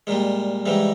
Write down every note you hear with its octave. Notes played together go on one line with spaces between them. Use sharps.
A#2 G3 G#3
G#2 E3 G3 G#3